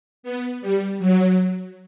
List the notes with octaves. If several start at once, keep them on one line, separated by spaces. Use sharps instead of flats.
B3
G3
F#3